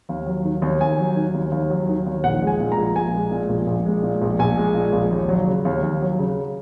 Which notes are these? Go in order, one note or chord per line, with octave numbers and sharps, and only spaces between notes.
D#2
F#3
D#3
D#2
D#2 G#5
F#3
D#3
D#2
D#2
F#3
D#3
D#2
A#1 F#5
G#3
G#5
A#2
A#5
A#1
A#1 G#5
G#3
A#2
A#1
A#1
G#3
A#2
A#1
A#1 G#5
G#3
A#2
A#1
D#2
F#3
C#3
D#2
D#2
F#3
C#3